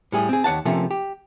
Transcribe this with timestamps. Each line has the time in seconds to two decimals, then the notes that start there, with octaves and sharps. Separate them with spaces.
0.12 A2 G3 G#4
0.29 C4 G#4
0.44 D#2 C#5 F#5 A5
0.65 C3 F3 A3 A#3 C#4
0.91 G4